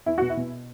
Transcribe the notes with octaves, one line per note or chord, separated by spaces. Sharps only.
E2 E4
B2 F#4
E4
B2